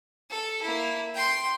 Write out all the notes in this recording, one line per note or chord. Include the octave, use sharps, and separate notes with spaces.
A4
A#3 E4
G5 C6